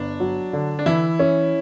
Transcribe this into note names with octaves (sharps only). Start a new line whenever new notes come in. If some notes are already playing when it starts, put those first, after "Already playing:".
Already playing: G1 D4
F#3
D3
D4
E3 E4
C#4